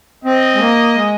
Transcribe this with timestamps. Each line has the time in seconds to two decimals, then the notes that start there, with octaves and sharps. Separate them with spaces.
0.24 C4 D#5
0.55 G#3
0.59 A#3
0.95 G#3